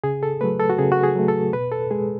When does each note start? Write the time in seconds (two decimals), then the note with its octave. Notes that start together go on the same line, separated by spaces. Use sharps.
0.04 C#3 G#4
0.23 A4
0.41 F#3 A3 B4
0.60 A4
0.70 F#4
0.79 C#3 G#4
0.92 F#4
1.03 G#4
1.16 F#3 A3
1.28 A4
1.53 B2 B4
1.72 A4
1.91 G#3 G#4